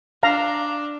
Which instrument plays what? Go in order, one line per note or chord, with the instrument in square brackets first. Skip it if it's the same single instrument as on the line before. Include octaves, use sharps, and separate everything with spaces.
[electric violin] D4 [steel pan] F5 A#5